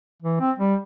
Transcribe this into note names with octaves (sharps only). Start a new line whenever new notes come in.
E3
C4
G3